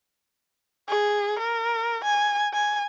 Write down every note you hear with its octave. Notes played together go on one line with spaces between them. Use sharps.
G#4
A#4
G#5
G#5